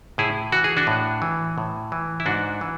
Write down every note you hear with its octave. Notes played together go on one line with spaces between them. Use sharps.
A2 E4 G#4
E3 F#4
G#4
D4 F#4
A2
E3
A2
E3
E4
G#2 D4 F#4
E3